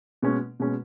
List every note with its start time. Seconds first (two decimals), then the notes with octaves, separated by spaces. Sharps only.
0.22 B2 G#3 C#4
0.60 B2 G#3 C#4